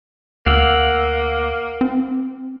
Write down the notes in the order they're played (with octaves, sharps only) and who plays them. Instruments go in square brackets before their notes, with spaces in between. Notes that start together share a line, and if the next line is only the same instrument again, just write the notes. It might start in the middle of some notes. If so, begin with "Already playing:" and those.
[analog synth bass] D2 [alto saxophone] A#3 [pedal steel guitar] F5 F#5 E6
[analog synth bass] C4